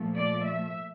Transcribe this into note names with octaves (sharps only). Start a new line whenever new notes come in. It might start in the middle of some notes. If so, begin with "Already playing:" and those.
Already playing: A#2 F3 A3
D5
E5